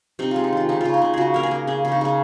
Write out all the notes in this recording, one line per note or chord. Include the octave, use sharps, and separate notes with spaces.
C3 D#4
G#3 F4
D#4
D#3 F4
C#3 D#4
C#3 F4
D#4
C#3
C#3 F#4 G#4
A#3 A#4
G#4
A#3
C#3 G#4
C#3
D#4
C#3 C#4